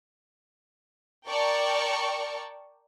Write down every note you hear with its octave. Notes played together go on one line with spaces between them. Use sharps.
A#4 D5 G5 A5 C#6